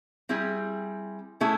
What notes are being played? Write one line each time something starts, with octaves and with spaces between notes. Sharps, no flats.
G3 C4 E4 G#4
A3 C#4 E4 G#4